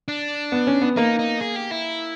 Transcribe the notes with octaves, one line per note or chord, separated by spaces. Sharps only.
D4
B3
C#4
B3
A#3 D#4
D#4
G#4
G4
E4